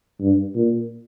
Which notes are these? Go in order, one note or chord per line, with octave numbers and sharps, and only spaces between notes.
G2
A#2